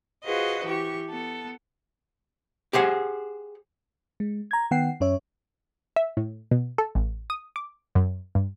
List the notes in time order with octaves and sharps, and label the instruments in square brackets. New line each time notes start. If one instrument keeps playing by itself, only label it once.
[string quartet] F4 F#4 G#4 B4 C5 D#5
E3 G4 C#6
B3 A4
[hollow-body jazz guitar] G4 G#4 C5 F#5
[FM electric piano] G#3
A#5 G#6
D#3 B3 F#5 G5 C7
F#2 C#4 C#5 E5
[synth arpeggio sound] E5
A2
B2
A4
A1
D#6
D6
F#2
G2